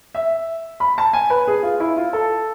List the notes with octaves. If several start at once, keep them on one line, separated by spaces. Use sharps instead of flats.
E5
B5
A5
G#5
B4
G#4
F4
E4
F4
A4